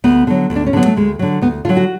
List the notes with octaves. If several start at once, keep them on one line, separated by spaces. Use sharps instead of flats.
D2 B3
D3 F#3
D2
D4
C#4
D3 F#3 B3
A3
D2 G#3
D3 F#3
D2 B3
D3 F#3 F4
F#4